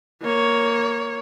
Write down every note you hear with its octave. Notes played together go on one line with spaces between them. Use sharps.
A#3 C#5